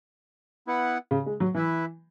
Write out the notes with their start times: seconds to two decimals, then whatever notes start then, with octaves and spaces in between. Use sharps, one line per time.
0.67 B3 E4 B4 F#5
1.11 C#3
1.26 G#3
1.40 F#3
1.54 E3 E4 B4 E5